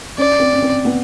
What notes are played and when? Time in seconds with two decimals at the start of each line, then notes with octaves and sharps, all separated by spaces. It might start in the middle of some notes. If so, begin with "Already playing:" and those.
0.18 C#4 D5
0.40 C4
0.53 C#4
0.62 C4
0.85 B3